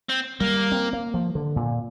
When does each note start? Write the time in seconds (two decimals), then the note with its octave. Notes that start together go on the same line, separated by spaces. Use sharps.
0.10 C4
0.40 G3 A#3
0.72 C4
0.93 A#3
1.14 F3
1.35 D3
1.56 A#2